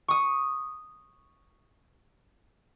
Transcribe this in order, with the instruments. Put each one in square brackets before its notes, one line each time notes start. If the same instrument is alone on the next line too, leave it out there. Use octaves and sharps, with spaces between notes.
[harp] C#6 D#6